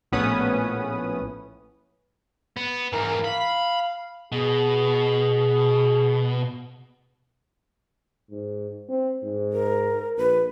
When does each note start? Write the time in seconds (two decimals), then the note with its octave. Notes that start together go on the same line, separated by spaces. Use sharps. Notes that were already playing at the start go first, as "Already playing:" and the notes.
0.12 A#1 A2 B3 C#4 B4 D#6
2.57 B3
2.93 G#2 E3 A#4
3.24 F5 B5
4.32 B2 G#4
8.30 G#2
8.89 C4
9.23 G#2
9.53 A#4
10.17 A#1 B4